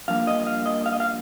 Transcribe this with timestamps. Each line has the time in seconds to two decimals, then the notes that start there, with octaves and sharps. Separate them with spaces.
0.08 G2 F3 A#3 F5
0.27 D#5
0.47 F5
0.66 D#5
0.86 F5
0.93 D#5
1.00 F5